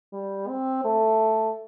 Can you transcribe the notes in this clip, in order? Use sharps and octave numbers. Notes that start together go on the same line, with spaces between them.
G3
C4
A3